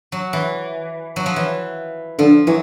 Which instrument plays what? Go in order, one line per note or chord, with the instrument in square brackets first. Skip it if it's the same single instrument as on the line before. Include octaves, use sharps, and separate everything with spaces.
[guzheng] F#3
E3
F#3
F3
E3
[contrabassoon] D3 [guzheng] F3
[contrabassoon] E3 [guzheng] F#3